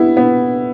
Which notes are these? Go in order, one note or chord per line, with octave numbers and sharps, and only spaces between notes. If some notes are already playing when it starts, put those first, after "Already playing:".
Already playing: G3 B3 E4
B3